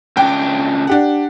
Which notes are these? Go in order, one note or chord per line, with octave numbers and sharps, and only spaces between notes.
C#2 D4 G5
D4 G4 F#5